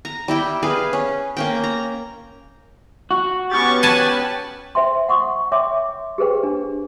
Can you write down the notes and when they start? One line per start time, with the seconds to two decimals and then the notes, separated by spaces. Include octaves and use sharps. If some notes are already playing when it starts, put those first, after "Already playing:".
0.05 A#5
0.28 G3 E4 G5
0.63 G#4 B4 F5
0.93 C#4
1.37 A#3 C#4 G5
1.64 A#5
3.11 F#4
3.51 B3 C#4 G4 C#6 A6
3.83 B4 G#5 A5
4.75 C5 E5 G5 C6
5.08 F#5 C6 C#6 D#6
5.52 C#5 E5 G5 C6 D6
6.18 G4 G#4 B4 C5 G5
6.43 D4